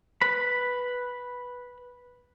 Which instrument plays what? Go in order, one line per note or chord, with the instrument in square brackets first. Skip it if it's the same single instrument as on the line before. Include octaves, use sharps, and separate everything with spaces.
[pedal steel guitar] B4 B5